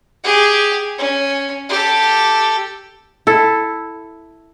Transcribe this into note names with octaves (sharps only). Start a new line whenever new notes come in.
G4 G#4
C#4
G4 A4
E4 A4